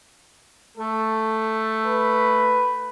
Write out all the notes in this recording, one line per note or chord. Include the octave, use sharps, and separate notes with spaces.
A3 A4
B4